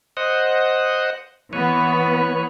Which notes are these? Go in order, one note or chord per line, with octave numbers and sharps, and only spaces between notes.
C5 D#5 F#5
E3 B3 B4 C#5